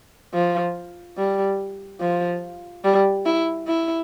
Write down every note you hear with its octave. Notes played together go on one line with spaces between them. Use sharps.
F3
G3
F3
G3
E4
E4